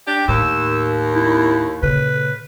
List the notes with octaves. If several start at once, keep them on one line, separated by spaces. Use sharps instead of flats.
D4 G4
D#2 A2 E6
E4
A#2 C#3 B4